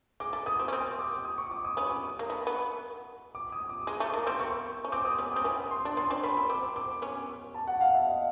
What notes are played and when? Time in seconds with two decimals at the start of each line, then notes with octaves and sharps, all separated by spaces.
0.20 G#3 D6
0.33 A3
0.46 B3 D#6
0.59 C4
0.68 C#4
0.73 C4
0.99 D6
1.25 D#6
1.38 C#6
1.51 D6
1.64 D#6
1.77 B3 C#4 D#6
2.19 A#3
2.30 B3
2.47 B3
3.35 D6
3.52 D#6
3.70 D6
3.87 G#3
4.00 A3
4.14 A#3 D6
4.27 C4
4.39 B3 C#6
4.85 C#4
4.92 C4 D6
5.05 D#6
5.18 B3 C#4
5.32 D#6
5.36 C4
5.44 B3 C#4 D#6
5.71 C6
5.85 D4
5.97 B3 C#4 C6
6.11 C4 D4
6.23 B3 C#4 B5
6.37 C4
6.50 C4 D6
6.76 C4 D6
7.02 B3 C#4
7.54 A5
7.67 F#5
7.81 F5
7.94 E5
8.07 D#5